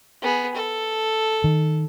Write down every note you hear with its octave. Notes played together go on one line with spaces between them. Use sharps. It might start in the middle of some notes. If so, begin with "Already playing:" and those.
B3 G#4
A4
D#3